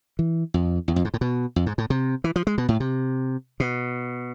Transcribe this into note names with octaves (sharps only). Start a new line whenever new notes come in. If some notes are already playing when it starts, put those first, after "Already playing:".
E3
F2
E2
F2
G#2
A2
B2
F2
G#2
A2
C3
E3
F3
G#3
B2
A2
C3
B2